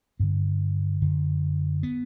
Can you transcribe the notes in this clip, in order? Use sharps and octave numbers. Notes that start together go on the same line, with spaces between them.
G2 D3 C4
F#2 D3
B3